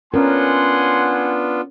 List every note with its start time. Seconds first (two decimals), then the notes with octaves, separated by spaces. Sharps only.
0.14 B3 C#4 D4 F4 A#4 F#5 G#5 C6